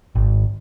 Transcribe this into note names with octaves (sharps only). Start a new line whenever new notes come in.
G#1